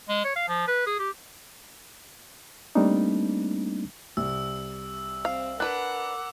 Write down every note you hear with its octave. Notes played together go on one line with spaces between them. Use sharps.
G#3
C#5
F5
F3
B4
G#4
G4
G3 A3 A#3 C4 D4 D#4
C2 E6
C4 F5
D4 A#4 B4 F#5 D6 F#6